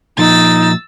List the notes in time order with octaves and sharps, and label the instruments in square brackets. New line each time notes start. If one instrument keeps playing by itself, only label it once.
[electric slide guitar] A#2 F3 [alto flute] D#4 [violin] E6 A6